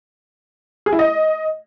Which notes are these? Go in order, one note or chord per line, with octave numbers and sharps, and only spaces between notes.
G#4
E4
D#5